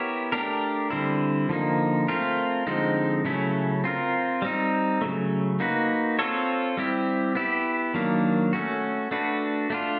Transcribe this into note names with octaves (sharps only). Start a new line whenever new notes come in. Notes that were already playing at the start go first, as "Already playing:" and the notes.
Already playing: B3 E4 G4 A#4 C#5
A3 D4 G4 A#4
D3 G3 C4 E4
D3 F3 A#3 D#4
A3 C4 F4 A#4
D3 F3 G#3 C4 D#4
C#3 F#3 A3 C#4 E4
C4 F4 A#4
G3 C4 D#4
C#3 F#3 A3
A#3 D#4 F#4 B4
C4 F4 A4 C#5
G3 C4 E4 G4
B3 E4 G4
D#3 F#3 A#3 D4
A3 C#4 F#4
A3 D4 F#4 B4
A3 D4 F4